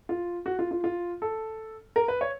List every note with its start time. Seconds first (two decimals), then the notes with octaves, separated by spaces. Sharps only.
0.09 F4
0.46 F#4
0.59 F4
0.71 F4
0.84 F4
1.22 A4
1.96 A#4
2.08 B4
2.21 C#5